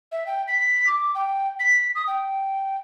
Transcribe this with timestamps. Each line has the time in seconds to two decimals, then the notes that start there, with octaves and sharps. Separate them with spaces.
0.11 E5
0.26 G5
0.47 B6
0.86 D6
1.14 G5
1.59 B6
1.95 D#6
2.07 G5